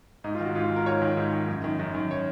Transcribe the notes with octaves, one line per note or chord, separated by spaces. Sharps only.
G#2 D#4
F4
D#3 F#4
G#2 F4
F#4
D#3
A#4
G#2 C#5
D#3
G#2
D#3
F#2
D#3
F#2
D#3
C#5